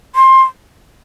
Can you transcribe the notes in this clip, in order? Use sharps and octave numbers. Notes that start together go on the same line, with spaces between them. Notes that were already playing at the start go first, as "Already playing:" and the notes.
C6